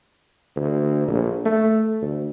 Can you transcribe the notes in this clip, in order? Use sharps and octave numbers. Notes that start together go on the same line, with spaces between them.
D2
A#1
A3
D2